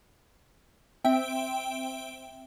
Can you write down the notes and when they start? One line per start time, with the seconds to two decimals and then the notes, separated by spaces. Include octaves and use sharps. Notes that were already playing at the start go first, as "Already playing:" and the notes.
1.04 C4 E5 G5 D7